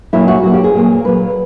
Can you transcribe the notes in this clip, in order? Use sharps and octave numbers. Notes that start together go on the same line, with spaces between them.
A#2 F#3 A#3 E4
F#4
A#2 F#3 A#3 F#4
G4
G#4
A#2 F#3 A#3
A#2 F#3 A#3 B4